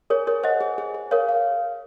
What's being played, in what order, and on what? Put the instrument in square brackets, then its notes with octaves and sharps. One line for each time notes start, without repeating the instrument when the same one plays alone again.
[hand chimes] G#4 [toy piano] A#4 C#5
[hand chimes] G#4 [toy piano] A#4 C#5
[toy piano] C5 D#5 [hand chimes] F#5
[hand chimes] G#4
G#4
G#4
[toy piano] A#4 C#5 [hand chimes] F5
[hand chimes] F5